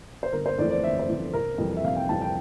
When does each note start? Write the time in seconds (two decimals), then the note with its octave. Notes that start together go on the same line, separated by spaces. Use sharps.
0.23 C5
0.32 G1 A#4
0.46 C5
0.58 F2 E3 A3 D5
0.70 D5
0.83 G1 E5
0.99 C5
1.08 F2 E3 A3
1.33 F1 A#4
1.58 F2 E3 G3
1.77 E5
1.83 F1 F5
1.96 G5
2.09 F2 E3 G3 A5
2.21 G5